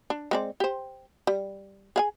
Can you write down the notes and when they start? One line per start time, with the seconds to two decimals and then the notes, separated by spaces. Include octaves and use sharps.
0.10 D4
0.31 G#3 C4 D5
0.60 G4 C5
1.27 G3
1.96 G#4 F5 G#5